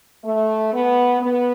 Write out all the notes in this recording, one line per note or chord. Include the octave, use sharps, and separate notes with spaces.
A3
B3
B3